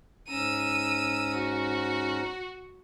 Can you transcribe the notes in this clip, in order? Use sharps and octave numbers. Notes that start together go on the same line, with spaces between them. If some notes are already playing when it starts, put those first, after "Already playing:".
G#2 C#4 A#5 E6 D#7
F#4